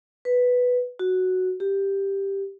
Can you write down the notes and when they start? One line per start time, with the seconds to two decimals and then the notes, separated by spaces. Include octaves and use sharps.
0.25 B4
0.99 F#4
1.60 G4